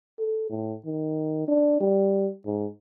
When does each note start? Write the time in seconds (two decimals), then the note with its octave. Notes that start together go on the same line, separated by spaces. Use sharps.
0.19 A4
0.50 A2
0.85 D#3
1.48 D4
1.80 G3
2.46 G#2